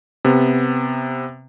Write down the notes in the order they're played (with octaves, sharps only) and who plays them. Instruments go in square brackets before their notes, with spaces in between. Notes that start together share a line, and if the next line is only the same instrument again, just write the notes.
[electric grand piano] C3 B3